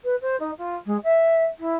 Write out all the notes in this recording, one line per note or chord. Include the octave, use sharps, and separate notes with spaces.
B4
C5
D#4
F4
G#3
E5
E4